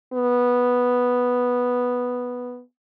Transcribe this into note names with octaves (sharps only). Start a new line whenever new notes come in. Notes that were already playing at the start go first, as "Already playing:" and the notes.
B3